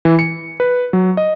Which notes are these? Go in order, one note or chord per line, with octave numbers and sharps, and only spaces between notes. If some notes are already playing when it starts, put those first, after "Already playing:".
E3
C#7
B4
F#3
D#5